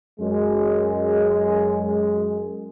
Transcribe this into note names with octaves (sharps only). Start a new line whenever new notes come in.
F#2 G#3